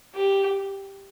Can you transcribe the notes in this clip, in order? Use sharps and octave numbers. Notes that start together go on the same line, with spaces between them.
G4